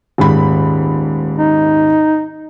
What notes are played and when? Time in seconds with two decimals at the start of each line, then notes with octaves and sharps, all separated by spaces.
0.18 D#1 G#2 B5
1.38 D#4